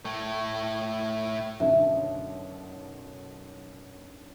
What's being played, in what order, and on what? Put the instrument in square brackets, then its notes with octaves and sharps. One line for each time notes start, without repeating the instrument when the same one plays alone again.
[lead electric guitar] A2 A3
[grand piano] F#1 B1 D3 [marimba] E5